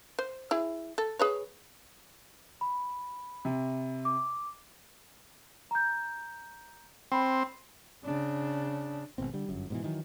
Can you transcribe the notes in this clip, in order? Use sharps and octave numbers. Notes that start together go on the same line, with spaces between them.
C5
E4 G#4
A4
G#4 B4 C#5
B5
C3
D6
A#5 G6
C4 G5 B5 C6
C#3 D4
G#1 C#2 B2 C4
D3 G3
G1 F#2
G#2 B2 E3
D#3 E3 F#3